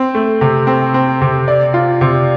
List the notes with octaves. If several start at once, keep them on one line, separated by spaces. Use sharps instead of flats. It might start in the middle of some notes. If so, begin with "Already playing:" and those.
Already playing: C4
A3
C3
C4
C4
C3
D5
F4
C3